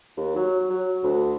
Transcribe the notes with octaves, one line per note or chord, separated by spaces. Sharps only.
D#2
F#3
F#3
D2